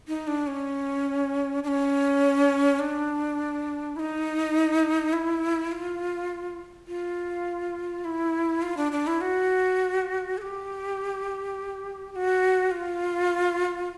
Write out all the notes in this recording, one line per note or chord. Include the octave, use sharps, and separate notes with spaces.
D#4
D4
C#4
D4
C#4
D4
E4
D#4
E4
F4
F4
E4
F4
D4
D4
E4
F#4
A4
G4
G4
F#4
F4